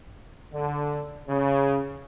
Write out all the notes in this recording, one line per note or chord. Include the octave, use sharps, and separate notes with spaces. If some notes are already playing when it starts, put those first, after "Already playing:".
D3
C#3